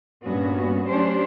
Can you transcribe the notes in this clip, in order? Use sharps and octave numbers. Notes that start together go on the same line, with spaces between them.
G2 A#2 G3 B3 C#4 F#4
F#3 A3 C#4 D4 G4 C5